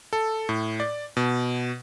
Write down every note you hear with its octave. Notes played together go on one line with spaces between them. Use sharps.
A4
A2
D5
B2